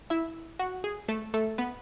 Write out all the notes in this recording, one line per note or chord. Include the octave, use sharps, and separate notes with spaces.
E4 E5
F#4
G#4
A3 A4
A3 A4
B3 B4